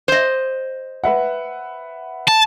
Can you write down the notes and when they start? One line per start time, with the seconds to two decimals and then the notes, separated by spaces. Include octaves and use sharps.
0.08 C5 D#5
1.04 B4 E5 F#5
2.28 A5